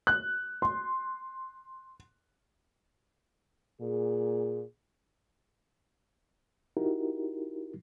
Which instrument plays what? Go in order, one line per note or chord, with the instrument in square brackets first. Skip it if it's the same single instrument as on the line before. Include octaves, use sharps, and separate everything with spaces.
[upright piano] F#6
C6
[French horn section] A#2 G#4
[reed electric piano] D#4 E4 F#4 G4 A#4